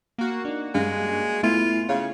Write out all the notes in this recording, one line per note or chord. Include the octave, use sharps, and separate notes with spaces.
A#3 F#4
D4 D#4
G2 G#3 F5
A3 B3 E4 F4
C#3 C#5 F5